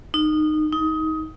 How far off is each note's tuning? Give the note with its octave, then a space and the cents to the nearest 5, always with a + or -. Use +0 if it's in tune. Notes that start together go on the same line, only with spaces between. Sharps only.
D#4 -20
D#4 +20